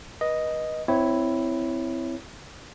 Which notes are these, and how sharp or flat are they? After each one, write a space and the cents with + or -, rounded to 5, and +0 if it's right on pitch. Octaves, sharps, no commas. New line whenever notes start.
B4 -30 D#5 +0
C4 -20 E4 +0 C#5 +0